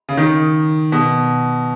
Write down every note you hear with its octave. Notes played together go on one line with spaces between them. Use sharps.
C#3
D#3
B2